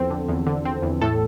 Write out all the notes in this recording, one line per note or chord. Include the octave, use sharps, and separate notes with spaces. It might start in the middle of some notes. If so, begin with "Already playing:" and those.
Already playing: E2 F3 C4 A4
D3
E2
D3
C4
E2
A2 A4